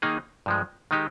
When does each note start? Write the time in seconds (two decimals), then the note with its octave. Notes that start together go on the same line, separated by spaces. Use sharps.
0.02 D#3 A#3 D#4 G#4
0.46 G2 F3 G#3
0.91 D#3 G#3 D#4 G4